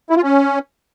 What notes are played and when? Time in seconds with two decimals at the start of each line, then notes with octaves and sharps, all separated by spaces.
0.10 E4
0.17 F4
0.23 C#4